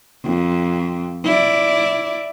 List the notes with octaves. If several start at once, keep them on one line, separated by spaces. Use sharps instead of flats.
F2
E4 D5